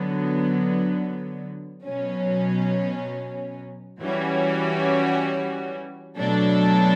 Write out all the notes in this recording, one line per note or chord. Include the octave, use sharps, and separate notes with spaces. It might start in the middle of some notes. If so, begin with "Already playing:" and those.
Already playing: D3 F#3 B3
B2 F#3 C#4
E3 G3 C#4 F#4
B2 F#3 A3 D4 A4